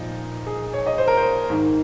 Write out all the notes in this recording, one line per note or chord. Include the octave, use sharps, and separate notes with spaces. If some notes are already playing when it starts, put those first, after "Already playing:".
Already playing: A#2 F3 D#4
G#4
C#5
D#5
C5
A#4
C5
G#2 D#3